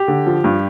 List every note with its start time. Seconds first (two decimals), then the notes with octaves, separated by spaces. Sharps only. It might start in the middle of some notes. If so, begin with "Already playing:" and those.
Already playing: G4
0.08 D3
0.26 F3
0.44 G2